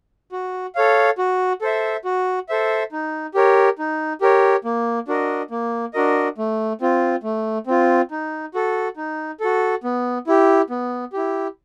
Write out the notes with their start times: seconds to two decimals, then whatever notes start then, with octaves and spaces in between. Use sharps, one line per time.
0.32 F#4
0.75 A4 C#5 F5
1.18 F#4
1.62 A4 C5 E5
2.05 F#4
2.49 A4 C5 E5
2.92 D#4
3.34 G4 A#4 C#5
3.79 D#4
4.21 G4 A#4 C#5
4.65 A#3
5.08 D4 F#4 A#4 D#5
5.51 A#3
5.94 D4 F#4 A#4 D#5
6.38 A3
6.81 C4 F4
7.23 A3
7.67 C4 F4
8.11 D#4
8.54 F#4 A4
8.97 D#4
9.40 F#4 A4
9.84 B3
10.27 E4 G4
10.70 B3
11.13 E4 G4